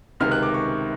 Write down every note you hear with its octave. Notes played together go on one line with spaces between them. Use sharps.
C#2 C3 D#3 F6
F#6
D6
C#6